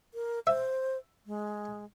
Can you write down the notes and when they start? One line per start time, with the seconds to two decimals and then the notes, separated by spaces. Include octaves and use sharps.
0.14 A#4
0.47 C5 E5
1.26 G#3